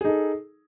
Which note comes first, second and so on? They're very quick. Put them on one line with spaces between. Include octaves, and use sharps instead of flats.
G#4 D#4 A4